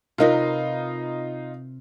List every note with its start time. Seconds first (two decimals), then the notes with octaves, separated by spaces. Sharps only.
0.18 C3 D#4 F4 A#4 B4